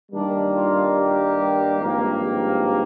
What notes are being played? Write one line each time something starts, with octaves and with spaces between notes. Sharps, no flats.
G2 D#3 G3 A#3 D4
F4
G4
G#1 G2 F3 A#3
G4